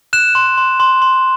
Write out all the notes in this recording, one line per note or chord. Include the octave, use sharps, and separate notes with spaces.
F#6 E7
C6
C6
C6
C6